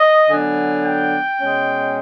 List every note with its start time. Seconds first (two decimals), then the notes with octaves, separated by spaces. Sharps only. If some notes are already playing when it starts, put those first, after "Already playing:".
Already playing: D#5
0.29 D3 F#3 B3 D4 G#5
0.84 G5
1.39 B2 G#3 C#4